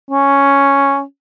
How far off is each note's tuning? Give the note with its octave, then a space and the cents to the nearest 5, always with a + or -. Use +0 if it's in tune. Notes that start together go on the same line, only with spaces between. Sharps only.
C#4 +0